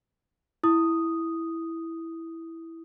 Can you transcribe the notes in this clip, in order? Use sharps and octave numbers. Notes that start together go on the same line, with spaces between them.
E4 D#6